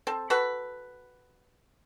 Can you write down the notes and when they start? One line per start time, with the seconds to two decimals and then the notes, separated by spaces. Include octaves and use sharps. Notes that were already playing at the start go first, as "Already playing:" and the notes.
0.07 C4 A4
0.30 F#4 A4 B4